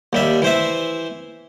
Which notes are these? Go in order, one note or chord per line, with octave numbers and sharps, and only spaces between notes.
D#2 G3 E5
E3 C5 E5